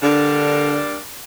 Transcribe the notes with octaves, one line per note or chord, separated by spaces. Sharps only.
D3 G3 A#3 D4